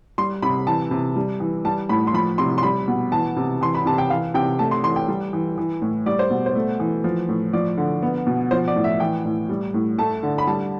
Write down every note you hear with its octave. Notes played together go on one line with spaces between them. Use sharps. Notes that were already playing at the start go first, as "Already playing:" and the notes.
G3 C6
C3 B5
E3 A5
C3
G3
E3
G3 A5
A2 B5
C6
F3 B5
C3 C6
C6
G3 B5
B2
E3 A5
C3
E3 C6
B5
C3 A5
G5
E3 F5
C3 G5
A3 A5
C6
E3 C6
G5
G3
E3
E3
A2
G3 D5
C5
B2
C5
A3
E3
F3
A2
F3 D5
D3
B3
B2
F3 C5
D5
A2
E5
E3 G5
A2
G3
A2
A3 A5
D3
B5
G3 A5